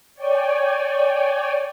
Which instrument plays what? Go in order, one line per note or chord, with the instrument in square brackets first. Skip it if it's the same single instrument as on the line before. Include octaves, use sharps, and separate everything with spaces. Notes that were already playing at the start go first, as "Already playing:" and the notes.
[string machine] C#5 D5 G5 G#5